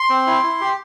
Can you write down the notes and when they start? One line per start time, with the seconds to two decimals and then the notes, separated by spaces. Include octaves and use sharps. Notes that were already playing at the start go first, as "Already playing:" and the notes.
Already playing: C6
0.10 C4
0.27 E4
0.43 E4
0.61 G4